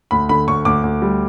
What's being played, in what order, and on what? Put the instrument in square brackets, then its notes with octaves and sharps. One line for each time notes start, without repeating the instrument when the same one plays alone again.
[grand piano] D2 B5
D3 B5
D2 C#6
D2 D6
D2
G3